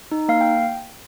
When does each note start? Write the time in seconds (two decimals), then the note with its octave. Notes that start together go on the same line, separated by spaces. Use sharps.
0.12 D#4
0.28 A#3 F5
0.41 G5